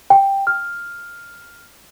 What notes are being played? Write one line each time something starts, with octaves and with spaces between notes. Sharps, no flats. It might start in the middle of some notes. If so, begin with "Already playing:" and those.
G5
F6